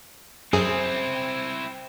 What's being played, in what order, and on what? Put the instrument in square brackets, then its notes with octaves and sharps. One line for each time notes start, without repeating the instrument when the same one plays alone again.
[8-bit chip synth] F#2 G#4 [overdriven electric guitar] C4 E4 [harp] C5